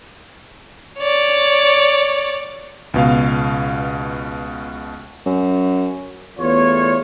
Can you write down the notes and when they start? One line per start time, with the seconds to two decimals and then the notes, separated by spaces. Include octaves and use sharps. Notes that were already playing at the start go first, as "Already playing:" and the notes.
0.99 C#5 D5
2.94 C#2 B2 F5
5.26 F#2
6.38 E2 A3 B3 F4 C#5